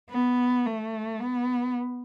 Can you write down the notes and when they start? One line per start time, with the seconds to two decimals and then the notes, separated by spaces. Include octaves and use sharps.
0.10 B3
0.66 A3
1.20 B3